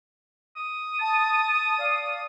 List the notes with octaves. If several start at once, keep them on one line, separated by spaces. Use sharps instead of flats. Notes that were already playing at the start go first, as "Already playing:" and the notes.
D#6
A5
D5 F5